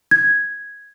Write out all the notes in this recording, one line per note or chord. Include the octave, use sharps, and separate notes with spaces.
G#6